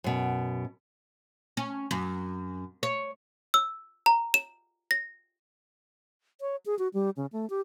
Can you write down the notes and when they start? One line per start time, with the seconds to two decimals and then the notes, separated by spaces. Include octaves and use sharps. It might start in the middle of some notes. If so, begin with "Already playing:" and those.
0.04 F#2 B2
1.57 C#4
1.91 F#2
2.83 C#5
3.54 E6
4.06 A#5
4.34 E7
4.91 A#6
6.41 C#5
6.66 G#4
6.79 F#4
6.94 G3
7.17 C#3
7.32 A3
7.50 G4